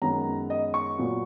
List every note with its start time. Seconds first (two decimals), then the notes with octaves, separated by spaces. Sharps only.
0.02 F#2 D#3 G#3 B3 A#5
0.50 D#5
0.74 C#6
0.98 A#2 F#3 B3